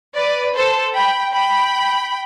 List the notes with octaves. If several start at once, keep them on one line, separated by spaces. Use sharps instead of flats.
B4 D5
A4 C5
G5 B5
G5 B5